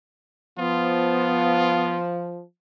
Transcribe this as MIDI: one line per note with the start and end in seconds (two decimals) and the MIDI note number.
0.59 2.42 53
0.59 1.97 59
0.59 2.01 65